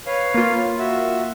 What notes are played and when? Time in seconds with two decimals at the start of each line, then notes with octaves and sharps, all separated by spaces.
0.06 B4 C#5 F5
0.34 A#3 F4
0.78 F#4 E5